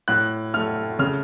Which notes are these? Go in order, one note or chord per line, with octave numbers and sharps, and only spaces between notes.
A2 F#6
A3 F6
C#3 F6